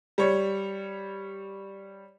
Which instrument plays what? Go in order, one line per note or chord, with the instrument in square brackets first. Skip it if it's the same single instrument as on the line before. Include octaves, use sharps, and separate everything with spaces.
[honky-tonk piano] G3 C#5